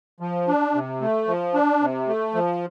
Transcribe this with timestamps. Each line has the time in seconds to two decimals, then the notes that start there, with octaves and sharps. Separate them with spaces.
0.20 F3
0.48 D4
0.74 C3
1.01 A3
1.27 F3
1.54 D4
1.81 C3
2.08 A3
2.34 F3